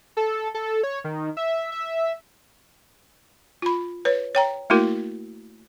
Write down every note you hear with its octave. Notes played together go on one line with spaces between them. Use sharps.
A4
A4
C#5
D#3
E5
E5
F4 B5
B4 C#5
C#5 G5 A#5
A3 A#3 E4 F#4 A#4